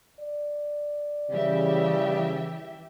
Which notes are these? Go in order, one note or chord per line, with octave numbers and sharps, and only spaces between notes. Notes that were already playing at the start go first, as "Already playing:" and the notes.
D5
C#3 E3 G3 G4 E5